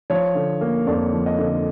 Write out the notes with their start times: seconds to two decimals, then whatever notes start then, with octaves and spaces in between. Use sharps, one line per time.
0.10 F3 C#5
0.35 D3
0.61 A#3
0.87 F2 D5
1.13 F3
1.26 D#5
1.38 D3